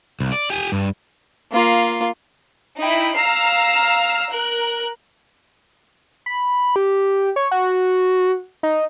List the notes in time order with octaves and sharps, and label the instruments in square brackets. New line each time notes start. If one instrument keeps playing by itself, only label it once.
[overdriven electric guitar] C2
D5
G4 G#5
G2
[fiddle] A#3 F4
[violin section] D#4 E4 G5 B5
F5 A#5 E6 F6 C7
A#4 F#6
[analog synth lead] B5
G4
C#5
F#4
D#4